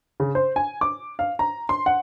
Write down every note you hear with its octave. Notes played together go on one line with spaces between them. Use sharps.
C#3
C5
G#5
D6
F5
A#5
C6
F#5